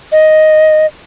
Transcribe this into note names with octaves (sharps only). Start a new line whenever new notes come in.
D#5